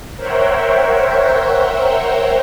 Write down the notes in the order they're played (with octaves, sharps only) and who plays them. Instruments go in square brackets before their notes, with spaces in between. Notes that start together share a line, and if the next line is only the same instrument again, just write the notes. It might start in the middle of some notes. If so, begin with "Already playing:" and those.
[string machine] A#4 C5 C#5 E5 F#5 G5